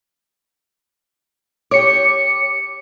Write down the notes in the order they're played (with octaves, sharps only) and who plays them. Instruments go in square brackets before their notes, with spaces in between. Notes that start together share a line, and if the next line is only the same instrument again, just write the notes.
[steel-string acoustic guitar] G4 C#5 [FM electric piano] D6 C#7